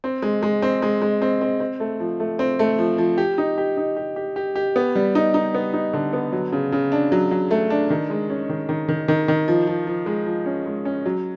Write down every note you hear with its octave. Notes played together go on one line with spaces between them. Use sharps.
C4
G#3
G#3
C4
G#3
G#3
C4
C4
C4
A3
F3
A3
C4
A3
F3
F3
G4
D#4
G4
D#4
G4
G4
G4
G4
B3
G3
D#4
D#4
B3
D#4
D3
B3
F#3
C#3
C#3
D4
F#3
F#3
A3
D4
D#3
G#3
C#4
D#3
D#3
D#3
D#3
D#3
F3
F3
F3
G#3
F3
C#4
G#3
C#4
F#3